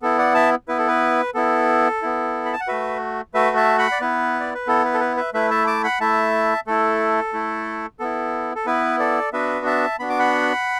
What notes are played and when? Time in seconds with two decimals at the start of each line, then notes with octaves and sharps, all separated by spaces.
0.02 B3 E4 A4
0.18 D5 F#5
0.35 E5 A5
0.68 B3 E4 B4
0.78 A4
0.88 B4
1.34 B3 E4 A4
2.02 B3 E4
2.46 B5
2.53 A5
2.60 F#5
2.67 A3 F#4 B4 E5
3.34 A3 F#4 B4 E5
3.56 E5 A5
3.78 F#5 B5
3.92 D5
4.00 B3 E4 B4
4.40 D5
4.54 B4
4.67 B3 E4 A4
4.85 B4
4.94 A4
5.00 B4
5.17 B4 E5
5.33 A3 E4 B4 E5
5.51 E5 A5
5.67 A5 D6
5.84 F#5 B5
6.00 A3 E4 E5 A5
6.67 A3 E4 A4
7.33 A3 E4
7.99 B3 E4 A4
8.55 A4
8.66 B3 E4 B4
8.99 A4 D5
9.33 B3 D4 F#4 B4 E5
9.66 E5 A5
9.99 B3 D4 F#4 B5
10.09 D6
10.19 F#5 B5